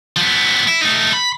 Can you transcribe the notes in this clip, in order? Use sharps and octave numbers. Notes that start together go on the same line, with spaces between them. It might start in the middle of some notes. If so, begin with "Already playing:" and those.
F3 B3
E4
A3 D#4
B5